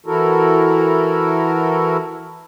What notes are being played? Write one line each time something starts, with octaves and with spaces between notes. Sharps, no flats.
E3 E4 F#4 A4 A#4